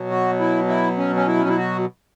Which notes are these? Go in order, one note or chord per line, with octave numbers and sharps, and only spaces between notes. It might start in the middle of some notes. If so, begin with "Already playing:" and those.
Already playing: B2 F#3
F#4
E4
E4
C#4
C#4
E4
C#4
E4
F#4